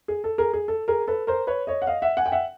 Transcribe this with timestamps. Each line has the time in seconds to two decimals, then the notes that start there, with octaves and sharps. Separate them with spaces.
0.08 G#4
0.24 A4
0.38 G#4 A#4
0.53 G#4
0.68 A4
0.88 G#4 A#4
1.08 A4 B4
1.27 A#4 C5
1.47 B4 C#5
1.67 C#5 D#5
1.82 F#5
1.87 D#5 F5
2.02 E5 F#5
2.17 F#5 G#5
2.26 G5
2.32 E5 F#5